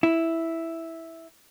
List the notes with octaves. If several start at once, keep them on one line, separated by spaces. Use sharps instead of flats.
E4